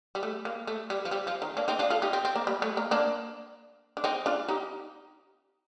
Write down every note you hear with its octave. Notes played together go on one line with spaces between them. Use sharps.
G3
A3
A#3
A3
G3
F3
G3
F3
D#3
A#3 D4
C4 D#4
D4 F4
F4 A4
D#4 G4
C4
C4
A#3
G3
A3
A#3
A#3 D4
D4
C4 D#4
D4 F4
D#4 G4